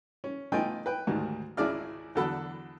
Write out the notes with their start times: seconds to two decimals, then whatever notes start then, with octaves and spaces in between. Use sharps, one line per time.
0.24 C#4
0.52 A3 B3 D#4 F4 G5 G#5
0.86 B4 G5
1.07 D2 G#2 D#3 G3
1.57 G#1 C#2 E4 G#4 D5 F6
2.15 E2 D3 F#3 A4 F#5 B5